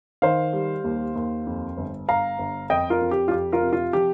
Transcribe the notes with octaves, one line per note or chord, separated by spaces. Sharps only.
D#3 C5 F5
G3
D#2
D#2
F2
G1
G1 F5 A#5
G1
F2 D#5 G5
F4 A#4
F2
G4
F4
F2 G4
F4 A#4
C3
F4
F3 G4